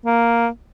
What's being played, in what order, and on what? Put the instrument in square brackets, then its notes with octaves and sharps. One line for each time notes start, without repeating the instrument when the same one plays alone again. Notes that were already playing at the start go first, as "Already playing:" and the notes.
[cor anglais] A#3